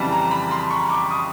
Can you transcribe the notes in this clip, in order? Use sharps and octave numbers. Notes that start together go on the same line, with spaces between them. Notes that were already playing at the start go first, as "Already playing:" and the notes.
Already playing: F2 C#3 E3 G3 A5
A#5
B5
C6
C#6
D6
D#6